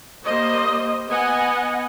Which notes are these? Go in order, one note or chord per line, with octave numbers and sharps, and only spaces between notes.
G3 A#3 C5 D#5
B3 D#5 F#5 G#5